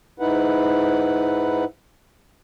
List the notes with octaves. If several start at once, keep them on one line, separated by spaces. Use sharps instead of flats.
G#2 D#4 E4 B4 F#5